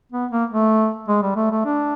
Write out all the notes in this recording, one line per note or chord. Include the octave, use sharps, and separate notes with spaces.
B3
A#3
A3
G#3
G3
A3
A3
D4